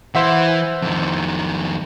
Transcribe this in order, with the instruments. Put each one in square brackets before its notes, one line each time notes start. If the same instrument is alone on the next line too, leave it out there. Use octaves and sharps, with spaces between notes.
[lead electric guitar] E3 [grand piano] C5 E5 F#5
[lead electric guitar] F2 D#3